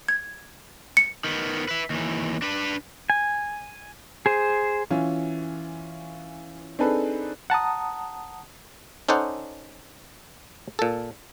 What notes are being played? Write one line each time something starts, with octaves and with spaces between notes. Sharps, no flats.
G#6
C#7
D#3 B3
B4 E5
D#2 E3
D4 B4
G#5
G#4 C5
E3 C#4 F4
C4 D4 D#4 G#4 A4 B4
F#5 A5 A#5 D#6
C#4 D#4 A4 C5 D5 F#5
A#2 A4